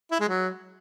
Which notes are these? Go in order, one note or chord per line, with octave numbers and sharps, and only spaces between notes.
E4
G#3
F#3